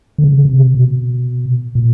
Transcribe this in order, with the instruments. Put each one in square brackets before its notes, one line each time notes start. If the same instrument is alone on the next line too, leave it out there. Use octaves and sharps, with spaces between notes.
[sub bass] D3
C#3
C#3
C3
B2
A#2